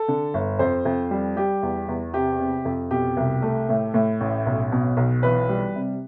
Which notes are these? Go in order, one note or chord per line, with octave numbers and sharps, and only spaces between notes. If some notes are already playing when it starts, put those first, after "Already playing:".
Already playing: A4
D3
G1
F2 C5
F2
G3
G3 G4
E2
E2
C3 G4
C3
F2
B2 G4
C2
A3
A2
A2
A1
B1
B2
B1
E3 B4
G3
C3